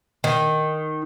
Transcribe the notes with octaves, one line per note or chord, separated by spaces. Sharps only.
D#3